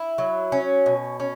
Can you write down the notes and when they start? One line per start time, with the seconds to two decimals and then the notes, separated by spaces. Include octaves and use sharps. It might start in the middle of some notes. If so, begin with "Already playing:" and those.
Already playing: E4
0.18 F#3
0.52 C#4
0.86 B2
1.20 C#4